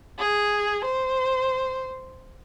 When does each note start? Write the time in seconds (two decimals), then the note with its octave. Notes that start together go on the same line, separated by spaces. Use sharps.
0.19 G#4
0.85 C5